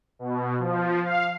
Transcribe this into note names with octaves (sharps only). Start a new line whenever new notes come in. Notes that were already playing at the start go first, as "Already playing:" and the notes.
B2
F3
F5